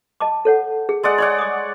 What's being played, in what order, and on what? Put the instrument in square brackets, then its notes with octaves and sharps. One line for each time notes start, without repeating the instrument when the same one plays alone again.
[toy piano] D#5 A5 D6
A4 C#5 F#5
G#4
[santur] G#3 D5 F#5
[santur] C#5 D5 F#5 [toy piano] C6
[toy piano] D6 D#6